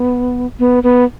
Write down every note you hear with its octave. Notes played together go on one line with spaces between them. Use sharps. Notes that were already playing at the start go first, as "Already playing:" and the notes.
Already playing: B3
B3
B3